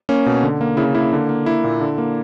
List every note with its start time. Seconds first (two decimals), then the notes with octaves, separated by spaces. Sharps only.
0.09 A#3 C#4
0.26 B2
0.43 D3
0.61 A#3
0.77 C#3 E4
0.95 A#3 E4
1.13 D3
1.29 A#3
1.46 A#3 E4
1.64 A#2
1.81 D3
1.98 A#3